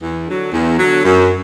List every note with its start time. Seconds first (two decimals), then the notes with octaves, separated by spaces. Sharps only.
0.01 E2
0.26 D3 F#3
0.52 E2
0.78 D3 F#3
1.03 F#2